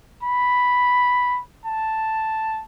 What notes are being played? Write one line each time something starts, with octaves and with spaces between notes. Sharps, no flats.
B5
A5